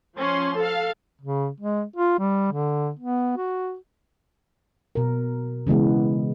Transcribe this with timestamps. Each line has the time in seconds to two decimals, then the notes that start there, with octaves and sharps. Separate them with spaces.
0.17 F3 C#4 C6
0.57 A4 F5
1.21 C#3
1.60 G#3
1.96 F4
2.19 G3
2.52 D3
2.99 B3
3.37 F#4
4.95 B2 A#4
5.67 C#3 E3 G#3 B3